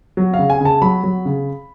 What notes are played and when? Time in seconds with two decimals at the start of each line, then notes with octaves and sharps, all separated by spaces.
0.17 F#3
0.34 C#3 F5
0.50 G#5
0.61 C#3 A5
0.82 F#3 B5
1.04 F#3
1.25 C#3